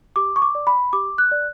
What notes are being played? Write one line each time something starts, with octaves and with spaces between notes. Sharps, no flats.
G4 D6
C#6
D6
D5
B5
G4 D6
F#6
D5